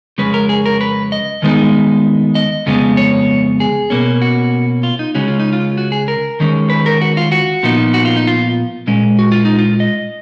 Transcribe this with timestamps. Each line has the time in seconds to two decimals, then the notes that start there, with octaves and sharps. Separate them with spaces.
0.18 F2 C#3 G#3 C#4 B4
0.34 A#4
0.49 G#4
0.66 A#4
0.81 B4
1.12 D#5
1.42 D#2 D#3 G#3 B3 D#4
2.35 D#5
2.66 F2 C#3 G#3 B3
2.97 C#5
3.60 G#4
3.90 B2 A#3 C#4
4.22 F#4
4.83 F4
4.99 D#4
5.15 C#2 C#3 G#3 C#4 F#4
5.28 F4
5.40 D#4
5.53 F4
5.78 F#4
5.92 G#4
6.08 A#4
6.40 D#2 D#3 G#3 C#4
6.70 B4
6.86 A#4
7.01 F#4
7.17 F4
7.32 F#4
7.63 A#2 F3 B3 D#4
7.94 F#4
8.05 F4
8.16 D#4
8.27 F4
8.87 A#2 G#3 C#4
9.19 F#4
9.32 F4
9.45 D#4
9.59 F4
9.80 D#5